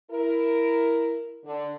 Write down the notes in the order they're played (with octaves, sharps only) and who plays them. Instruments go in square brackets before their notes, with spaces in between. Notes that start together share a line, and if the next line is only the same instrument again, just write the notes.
[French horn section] E4 A#4
D3